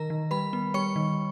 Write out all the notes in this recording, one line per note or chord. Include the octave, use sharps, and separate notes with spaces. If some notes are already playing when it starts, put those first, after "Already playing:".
Already playing: D#3 A#4 A#5
D#3
G3 B4 B5
B3
G3 C#5 C#6
D#3